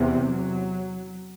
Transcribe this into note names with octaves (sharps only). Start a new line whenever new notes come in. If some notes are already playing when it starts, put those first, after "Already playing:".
Already playing: E2 C3
F#3